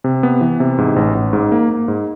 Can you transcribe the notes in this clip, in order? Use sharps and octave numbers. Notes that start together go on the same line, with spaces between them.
C3
B3
E3
C3
G#2
A1
A1
G#2
A#3
A#3
G#2